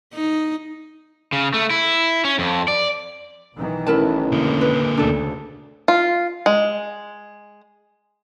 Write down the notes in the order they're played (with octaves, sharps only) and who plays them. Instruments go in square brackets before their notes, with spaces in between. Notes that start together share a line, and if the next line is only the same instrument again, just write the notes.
[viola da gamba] D#4
[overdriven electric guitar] C#3
A3
E4
C#4
F2
D5
[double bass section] B1 D#3 E3
[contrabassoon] A1 [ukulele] E4 A#4 A5
[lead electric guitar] D3 A#3
[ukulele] B4
[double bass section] D2 C#3 A3 [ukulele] D4 A4
[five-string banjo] F4
G#3